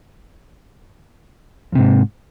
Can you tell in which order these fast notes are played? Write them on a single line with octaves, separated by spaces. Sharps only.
F2 C3 G#2